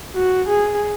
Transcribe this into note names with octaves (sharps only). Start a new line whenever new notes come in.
F#4
G#4